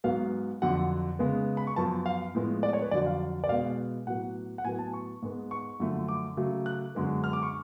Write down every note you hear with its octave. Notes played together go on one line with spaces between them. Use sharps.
G#2 F#3 B3 F5
F2 D3 F#3 F#5
C#3 G#3 B3
B5
C#6
F#2 F3 B3 A5
F5
A2 F3 G#3 B3
D5
C#5
B4
F2 D3 F#3 D5
F5
D5
B2 G#3 B3 F5
A2 F#3 B3 F#5
F#5
A2 F#3 B3 G#5
A5
C#6
G#2 G#3 B3
C#6
F#2 D3 F3 A3
D6
C#3 F#3 A3
F#6
F#2 D3 G#3 B3
F6
D6
C#6